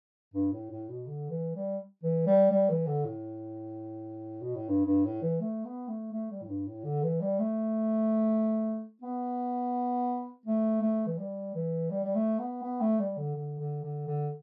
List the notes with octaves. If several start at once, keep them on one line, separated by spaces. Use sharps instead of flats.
G2
A2
A2
B2
D3
E3
G3
E3
G3
G3
E3
D3
A2
B2
A2
G2
G2
A2
E3
A3
B3
A3
A3
G3
A2
G2
A2
D3
E3
G3
A3
B3
A3
A3
E3
G3
E3
G3
G3
A3
B3
B3
A3
G3
D3
D3
D3
D3
D3